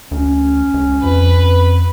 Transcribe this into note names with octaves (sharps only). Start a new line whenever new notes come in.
D2 C#4
C#2
F2 B4